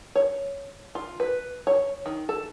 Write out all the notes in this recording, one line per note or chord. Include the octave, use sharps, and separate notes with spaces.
C#5
F4
B4
C#5
D#3
A4